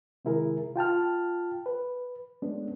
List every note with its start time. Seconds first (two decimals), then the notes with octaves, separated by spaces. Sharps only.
0.25 C3 D#3 G#3 E4 G#4 A#4
0.76 F4 G5 A5 F6
1.66 B4
2.42 G#3 A3 B3 C#4 D4